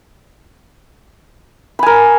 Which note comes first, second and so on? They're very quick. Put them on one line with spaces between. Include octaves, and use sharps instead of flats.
B5 G#5 A#4